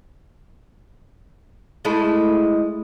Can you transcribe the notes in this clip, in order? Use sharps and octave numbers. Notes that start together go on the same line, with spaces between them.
G#3 A3 E4